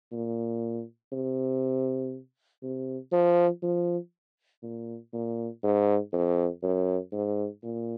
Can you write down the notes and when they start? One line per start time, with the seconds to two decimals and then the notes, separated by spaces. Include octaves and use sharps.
0.12 A#2
1.12 C3
2.63 C3
3.12 F3
3.62 F3
4.62 A#2
5.13 A#2
5.63 G#2
6.13 F2
6.63 F#2
7.12 G#2
7.63 A#2